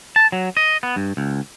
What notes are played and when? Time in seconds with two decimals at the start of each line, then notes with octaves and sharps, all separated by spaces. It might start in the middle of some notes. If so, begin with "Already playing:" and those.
0.16 A5
0.32 F#3
0.57 D#5
0.83 B3
0.96 G2
1.17 C#2